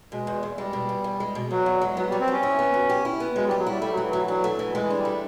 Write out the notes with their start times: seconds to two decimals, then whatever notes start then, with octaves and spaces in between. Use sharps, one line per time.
0.12 B2 G#3
0.27 E2
0.43 E2
0.58 G3 G#3
0.73 B2
0.89 E2
1.04 E2
1.20 G#3
1.35 B2
1.51 E2 F#3
1.66 E2
1.82 G#3
1.97 F#3 B3
2.09 G3
2.12 F#3
2.21 C4
2.28 C#4 G4
2.43 E4
2.59 B3
2.74 F#3
2.89 G4
3.05 E4
3.20 B3
3.36 F#3 G#3
3.47 G3
3.51 G4
3.59 F#3
3.67 G3 E4
3.81 G3 A3
3.92 F#3
3.97 E3
4.09 E3 F#3
4.28 F#3 D4
4.44 A3
4.59 E3
4.74 E3 G#3
4.90 D4
4.97 G3
5.05 A3